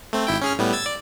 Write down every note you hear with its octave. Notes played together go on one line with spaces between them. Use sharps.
A3 C4
G#1 E4 G5
C#4 G#4 F6
A2 G3 B3
E6 G#6 A6
D5